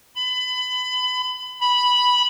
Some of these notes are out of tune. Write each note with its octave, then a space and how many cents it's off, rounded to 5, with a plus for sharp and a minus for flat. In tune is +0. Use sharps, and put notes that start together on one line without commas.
B5 +30
B5 -5